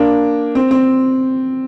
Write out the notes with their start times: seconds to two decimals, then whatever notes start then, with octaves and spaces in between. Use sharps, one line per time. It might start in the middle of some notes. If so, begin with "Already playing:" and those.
Already playing: A#3 D4
0.55 C4
0.71 C4